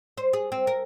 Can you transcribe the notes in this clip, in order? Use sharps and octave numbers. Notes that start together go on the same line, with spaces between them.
C5
G#4
C4
A#4